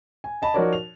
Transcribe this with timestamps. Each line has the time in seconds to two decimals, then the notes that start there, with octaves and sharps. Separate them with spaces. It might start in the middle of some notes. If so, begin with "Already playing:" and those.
0.24 G#5
0.42 D#5 A5 B5
0.54 F3 D#4 F#4 A#4 C#5 D5
0.73 F7